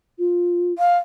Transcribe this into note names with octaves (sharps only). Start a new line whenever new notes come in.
F4
F5